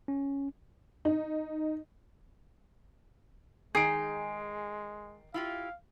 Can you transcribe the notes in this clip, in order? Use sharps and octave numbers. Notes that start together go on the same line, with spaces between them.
C#4
D#4
D#3 G#3 D#4 G#4 C7 D7
E4 F4 G4 F5